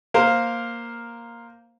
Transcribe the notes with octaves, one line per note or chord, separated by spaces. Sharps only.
A#3 A#4 C5 F5